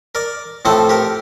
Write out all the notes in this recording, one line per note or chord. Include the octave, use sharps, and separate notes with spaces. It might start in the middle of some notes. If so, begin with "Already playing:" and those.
A#4 D5
A2 F3 A3 C4 A4 C5
G4 A#4